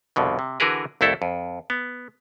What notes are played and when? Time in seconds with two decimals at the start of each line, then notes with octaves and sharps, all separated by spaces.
0.16 C2 F2 B2 D3
0.39 C3
0.60 D3 E3 F#4 G#4 A#4 B4
1.01 C2 F2 A3 E4 A4
1.22 F2
1.70 B3